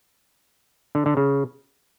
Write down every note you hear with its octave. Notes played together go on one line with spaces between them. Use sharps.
D3
D3
C#3